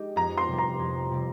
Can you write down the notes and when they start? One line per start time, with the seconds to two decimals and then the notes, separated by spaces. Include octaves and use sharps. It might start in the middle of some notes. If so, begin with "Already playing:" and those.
Already playing: G#3 D#4 G4
0.16 F2 A#5
0.38 C6
0.47 C3 G3
0.58 A#5
0.79 F2
1.11 C3 G3